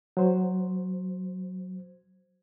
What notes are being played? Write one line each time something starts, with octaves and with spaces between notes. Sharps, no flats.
F#3 C5